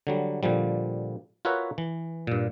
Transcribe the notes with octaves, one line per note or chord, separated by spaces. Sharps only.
D3 F#3 G3
A#2 D3 F3 G3
F4 F#4 A#4 B4 C#5 E5
E3
G2 A#2